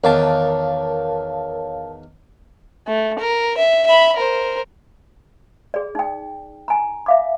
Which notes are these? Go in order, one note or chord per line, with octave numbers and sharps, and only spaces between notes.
E2 D#3 A#4 C#5 F5 A5 D6
A3
A#4
E5
E5 B5
A#4 C5
G#4 D5
D#4 G5
G#5 A#5
E5 F5 D6